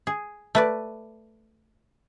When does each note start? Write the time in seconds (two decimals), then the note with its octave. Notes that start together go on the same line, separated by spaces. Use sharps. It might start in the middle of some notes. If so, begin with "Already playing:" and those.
0.07 G#4
0.55 A3 B4 D5